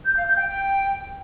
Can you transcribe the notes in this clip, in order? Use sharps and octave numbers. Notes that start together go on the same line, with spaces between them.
G6
F5
G6
G5
G5